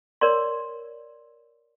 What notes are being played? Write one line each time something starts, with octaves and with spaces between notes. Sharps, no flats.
A#4 C#5 D5 C6